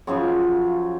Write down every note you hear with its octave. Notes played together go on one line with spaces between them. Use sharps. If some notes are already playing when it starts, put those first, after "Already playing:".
F#2 C#3 F3 C#5